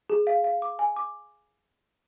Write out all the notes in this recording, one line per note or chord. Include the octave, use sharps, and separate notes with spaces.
G#4
F5
F5
D6
G#5
D6